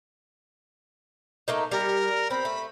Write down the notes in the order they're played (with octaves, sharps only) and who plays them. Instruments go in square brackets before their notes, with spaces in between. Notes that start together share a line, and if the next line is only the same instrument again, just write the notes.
[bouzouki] A3 A#3 D#4
[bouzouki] G3 [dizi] A#4
[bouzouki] C4 [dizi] B5
[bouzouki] A3